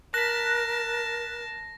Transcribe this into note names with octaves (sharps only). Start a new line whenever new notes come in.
A#4 A5 F#6 A#6 B6